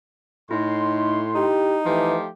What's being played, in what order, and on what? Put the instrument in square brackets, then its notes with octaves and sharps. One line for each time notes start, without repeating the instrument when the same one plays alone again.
[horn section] A2 C6 [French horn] D#4 [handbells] E4
[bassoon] D#4 [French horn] G4
[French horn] E3 [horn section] F3 A3 G4